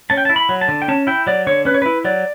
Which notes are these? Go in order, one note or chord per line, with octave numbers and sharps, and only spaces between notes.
C#4 A5
G5
A5
E4
B5
F#3
A5
D3
G5
C#4 A5
E4 G5
F#3 D5
D3 C#5
C#4 B4
C#5
E4 B4
F#3 D5